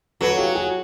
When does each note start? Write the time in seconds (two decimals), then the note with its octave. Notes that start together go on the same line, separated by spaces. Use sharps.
0.21 F#3 A4 B4
0.38 F4 G4
0.55 F#4 G#4